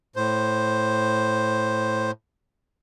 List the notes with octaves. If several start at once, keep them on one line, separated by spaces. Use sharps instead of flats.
A2 C5